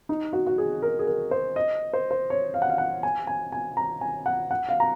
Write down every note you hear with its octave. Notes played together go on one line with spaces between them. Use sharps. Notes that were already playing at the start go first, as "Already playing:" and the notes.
D#4
F#4
F#4
G#4
A#4
G#4
A#4
C5
D#5
C5
C5
C#5
F5
F#5
F5
F#5
G#5
G#5
G#5
A#5
G#5
F#5
F#5
F5
A#5